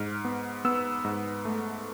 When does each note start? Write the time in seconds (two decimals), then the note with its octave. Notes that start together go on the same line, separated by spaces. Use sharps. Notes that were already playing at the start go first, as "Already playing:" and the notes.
Already playing: G#2 F6
0.25 B3
0.65 B3 E6
1.05 G#2
1.45 A3